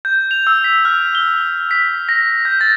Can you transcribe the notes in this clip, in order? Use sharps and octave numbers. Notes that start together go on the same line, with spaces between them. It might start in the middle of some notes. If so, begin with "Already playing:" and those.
G6
F7
E6
B6
F6
G7
B6
A#6
G6
A6